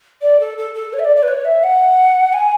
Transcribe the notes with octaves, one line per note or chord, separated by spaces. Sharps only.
D5
A4
A4
A4
C#5
E5
D5
D5
B4
C#5
E5
F#5
G#5